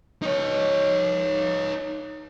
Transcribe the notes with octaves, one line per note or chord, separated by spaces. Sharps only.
D#4 C#5